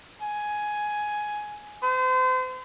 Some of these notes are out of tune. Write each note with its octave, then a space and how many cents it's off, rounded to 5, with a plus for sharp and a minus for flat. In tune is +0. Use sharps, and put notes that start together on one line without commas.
G#5 +10
C5 -35